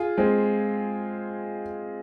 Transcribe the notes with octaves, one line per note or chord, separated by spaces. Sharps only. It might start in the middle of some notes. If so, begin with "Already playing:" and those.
Already playing: F4 G#4
G#3 C4